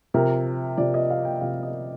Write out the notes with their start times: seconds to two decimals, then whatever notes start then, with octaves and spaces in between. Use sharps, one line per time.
0.14 C3 F3 A#4
0.77 C3 F3 D5
0.94 D#5
1.10 F5
1.25 G5
1.41 C3 F3 F5
1.63 D#5